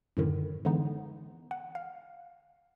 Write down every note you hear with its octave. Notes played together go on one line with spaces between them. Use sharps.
F#2 A2 D3 D#3
D3 E3 G#3 B3 D#4
F#5
F5